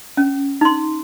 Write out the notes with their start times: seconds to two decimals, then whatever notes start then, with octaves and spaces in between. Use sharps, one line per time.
0.17 C#4
0.61 D#4 C6